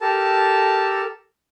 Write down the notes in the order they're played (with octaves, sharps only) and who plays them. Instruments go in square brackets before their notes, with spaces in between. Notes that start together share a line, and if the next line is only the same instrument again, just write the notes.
[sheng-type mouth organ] G4 A4 A#4 A5